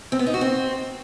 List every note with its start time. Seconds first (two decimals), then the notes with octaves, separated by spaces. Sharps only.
0.12 C4
0.19 B3
0.27 D#4
0.34 F#4
0.41 C4